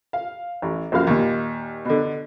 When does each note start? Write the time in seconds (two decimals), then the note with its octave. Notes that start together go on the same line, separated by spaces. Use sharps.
0.13 F5
0.62 A1
0.92 A#1 F#2 A#3 F#4 F5 F6
1.07 D#2 A#2
1.85 B2 D3